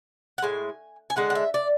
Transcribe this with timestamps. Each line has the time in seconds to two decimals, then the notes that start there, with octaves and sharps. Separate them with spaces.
0.38 F#5
0.42 A2 G#3 G#5
1.10 G#5
1.16 D3 G#3 D4 F#5
1.30 F#5
1.35 E5
1.54 D5